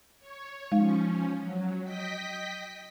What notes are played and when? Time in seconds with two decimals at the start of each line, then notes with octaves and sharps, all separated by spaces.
0.19 C#5
0.72 F3 G#3 C#4 D#4 F5
1.38 F#3
1.83 D#5 G5 B6